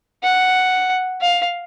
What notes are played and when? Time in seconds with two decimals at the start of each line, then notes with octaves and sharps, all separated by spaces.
0.23 F#5
1.21 F5